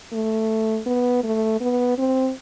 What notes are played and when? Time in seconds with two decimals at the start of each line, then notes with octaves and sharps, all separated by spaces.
0.13 A3
0.86 B3
1.23 A3
1.61 B3
1.98 C4